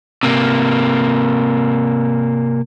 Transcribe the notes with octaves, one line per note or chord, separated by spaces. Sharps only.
C3 A#3